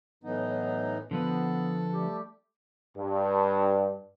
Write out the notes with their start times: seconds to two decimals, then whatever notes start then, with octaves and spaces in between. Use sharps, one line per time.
0.24 A2 E3 F#3 B3 D#4
1.11 D3 F3 B3 A4 B4
1.92 G3 A3 G4
2.97 G2